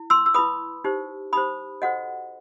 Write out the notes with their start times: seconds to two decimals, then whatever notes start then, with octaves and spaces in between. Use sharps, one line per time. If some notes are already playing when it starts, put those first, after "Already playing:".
Already playing: E4
0.10 C6 E6
0.26 E6
0.34 E4 B4 B5 D#6
0.84 D#4 G4 C5
1.33 D#4 G4 C5 B5 D#6
1.82 F#4 A4 C5 D#5 F#5